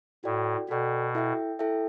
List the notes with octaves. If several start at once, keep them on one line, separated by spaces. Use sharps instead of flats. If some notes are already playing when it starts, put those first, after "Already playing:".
A2 F#4 A4 D5 G5
B2 F#4 A4 D5 G5
E4 A4 E5 G5
E4 A4 E5 G5